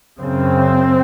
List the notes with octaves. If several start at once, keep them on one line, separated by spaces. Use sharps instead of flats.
F#2 C#3 C4